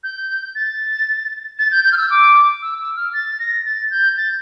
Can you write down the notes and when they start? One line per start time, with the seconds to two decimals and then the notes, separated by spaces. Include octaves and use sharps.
0.03 G6
0.55 A6
1.59 A6
1.71 G6
1.84 G6
1.92 F6
1.98 E6
2.10 D6
2.62 E6
2.79 E6
2.97 F6
3.13 A6
3.39 A#6
3.65 A6
3.91 G6
4.17 A6